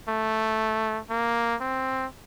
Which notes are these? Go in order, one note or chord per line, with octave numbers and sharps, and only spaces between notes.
A3
A#3
C4